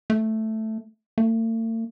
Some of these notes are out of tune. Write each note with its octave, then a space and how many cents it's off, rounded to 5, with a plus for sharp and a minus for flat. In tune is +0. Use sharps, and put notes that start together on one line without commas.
A3 +0
A3 +45